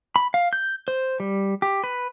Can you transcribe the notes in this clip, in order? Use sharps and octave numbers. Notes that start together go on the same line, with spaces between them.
B5
F5
G6
C5
G3
G4
B4